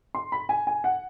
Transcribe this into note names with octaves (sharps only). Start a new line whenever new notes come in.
C6
B5
G#5
G#5
F#5